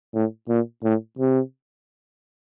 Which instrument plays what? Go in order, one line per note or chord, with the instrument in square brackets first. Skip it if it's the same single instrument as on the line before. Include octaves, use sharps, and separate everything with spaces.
[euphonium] A2
A#2
A2
C3